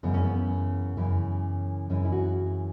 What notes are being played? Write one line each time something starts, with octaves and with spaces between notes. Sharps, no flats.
F#2 C#3 E3 B3
C#4
B3
F#2 C#3 E3
F#2 C#3 E3 C#4
E4
F#4